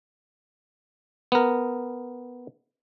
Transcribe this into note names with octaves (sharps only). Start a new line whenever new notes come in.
B3 A#4